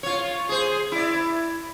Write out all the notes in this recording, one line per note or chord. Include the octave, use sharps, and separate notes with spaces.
F4 C#5
G#4 C5
E4 D5